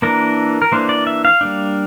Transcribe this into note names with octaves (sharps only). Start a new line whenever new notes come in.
E3 A#3 D4 A#4
A#4
E3 A#3 D4 C5
D5
E5
F5
G3 A#3 D4